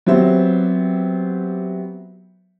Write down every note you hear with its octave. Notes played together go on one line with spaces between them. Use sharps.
F#3 B3 C4 G4 C5 E5